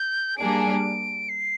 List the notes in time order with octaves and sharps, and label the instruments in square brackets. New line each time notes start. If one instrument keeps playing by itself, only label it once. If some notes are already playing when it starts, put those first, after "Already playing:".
Already playing: [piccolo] G6
[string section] G3 A#3 D4 G#4 [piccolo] D7
[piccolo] C7